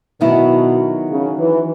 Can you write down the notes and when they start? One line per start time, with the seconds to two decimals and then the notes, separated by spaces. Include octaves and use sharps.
0.20 B2 D#3 F#3 B3 E4
1.09 C#3
1.38 E3